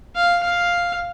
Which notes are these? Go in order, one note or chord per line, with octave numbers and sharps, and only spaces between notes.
F5
F5